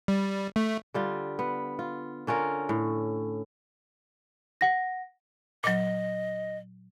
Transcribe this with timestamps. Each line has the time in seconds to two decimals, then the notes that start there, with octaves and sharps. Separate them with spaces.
0.08 G3
0.56 A3
0.94 D3 G3 F4
1.39 B3
1.79 F4
2.27 D3 C#4 F4 A#4
2.69 A2
4.61 F#5 A#6
5.64 A#2 F#3 D#5